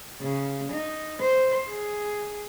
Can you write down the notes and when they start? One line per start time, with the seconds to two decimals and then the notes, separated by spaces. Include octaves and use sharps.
0.21 C#3
0.72 D#4
1.20 C5
1.69 G#4